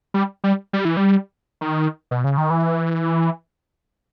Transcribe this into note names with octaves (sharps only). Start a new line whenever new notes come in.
G3
G3
G3
E3
G3
D#3
B2
C#3
D#3
E3